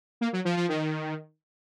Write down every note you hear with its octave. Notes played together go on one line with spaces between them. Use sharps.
A#3
F#3
F3
F3
D#3